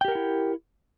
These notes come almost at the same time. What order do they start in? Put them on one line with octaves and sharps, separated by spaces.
G5 G4 A#4 F#5 E4